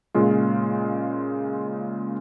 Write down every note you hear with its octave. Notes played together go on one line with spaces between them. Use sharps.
A#2 C#3 G#3 F4